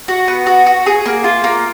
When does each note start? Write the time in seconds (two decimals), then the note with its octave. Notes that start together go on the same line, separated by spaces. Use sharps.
0.08 F#4
0.28 B3
0.47 F#4
0.66 F#4
0.86 G#4
1.06 A#3
1.24 F4
1.44 A#3